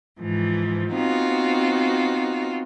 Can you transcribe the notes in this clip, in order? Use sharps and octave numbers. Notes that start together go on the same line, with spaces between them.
G#2 E3 F3
B3 C4 D#4 F4 F#4